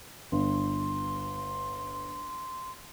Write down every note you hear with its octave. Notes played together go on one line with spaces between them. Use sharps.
G1 C6